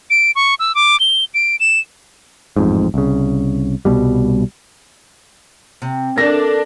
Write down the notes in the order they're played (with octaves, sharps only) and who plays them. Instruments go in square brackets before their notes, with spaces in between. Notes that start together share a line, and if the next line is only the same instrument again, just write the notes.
[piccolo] D7
C#6
E6
D6
G7
D7
E7
[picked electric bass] A1 F2 G#2
C2 C#3
C2 B2 G3
[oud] C3
[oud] A3 [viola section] D4 [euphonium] A#4 [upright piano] A#6